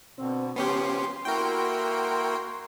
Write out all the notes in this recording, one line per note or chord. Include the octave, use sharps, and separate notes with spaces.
B2 D3 C4
C#3 F3 B3 C#4 G4 C6
A#3 E4 F#4 A#4 G5